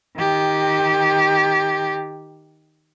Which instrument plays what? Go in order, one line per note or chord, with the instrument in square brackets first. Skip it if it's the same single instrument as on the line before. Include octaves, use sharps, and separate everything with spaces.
[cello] D#3 G4